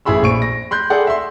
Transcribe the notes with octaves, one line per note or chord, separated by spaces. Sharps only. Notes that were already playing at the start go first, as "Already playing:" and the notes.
A1 E4 G#4 B5 E6
A#1 C#6 D7
A#6
B5 C6 F#6 G6
G#4 A4 D5 F#5
E5 C6